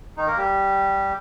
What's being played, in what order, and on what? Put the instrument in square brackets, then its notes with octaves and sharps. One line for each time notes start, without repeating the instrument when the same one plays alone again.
[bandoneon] D#3 D#4
A#3 A#4
G3 G4